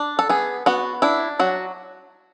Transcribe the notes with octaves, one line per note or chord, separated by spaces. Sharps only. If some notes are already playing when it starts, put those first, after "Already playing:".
Already playing: D4
A4
B3 G#4
B3 F#4
D4 E4
F#3 F#4